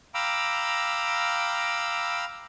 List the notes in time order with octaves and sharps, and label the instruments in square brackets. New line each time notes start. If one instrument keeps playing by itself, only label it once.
[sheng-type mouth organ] F5 G5 A#5 B5 D6 E6